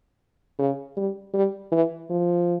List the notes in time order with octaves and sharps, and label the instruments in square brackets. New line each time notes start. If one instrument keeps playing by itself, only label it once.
[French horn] C#3
G3
G3
E3
F3